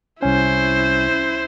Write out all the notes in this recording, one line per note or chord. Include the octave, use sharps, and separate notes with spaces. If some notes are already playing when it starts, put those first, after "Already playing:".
C2 C#4 E4 C5